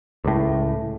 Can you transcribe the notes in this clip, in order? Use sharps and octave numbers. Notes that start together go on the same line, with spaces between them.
C#2 A2